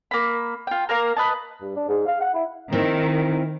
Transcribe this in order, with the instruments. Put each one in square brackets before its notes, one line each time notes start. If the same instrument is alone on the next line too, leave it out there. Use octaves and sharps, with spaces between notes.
[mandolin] A#3 B5
F4 G5
A#3 A#4 F5 A#5
B4 D#5 A5
[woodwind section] G2
D4
G#2
F5
F#5
E4
[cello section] D#3 [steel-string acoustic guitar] C4 E4 A#4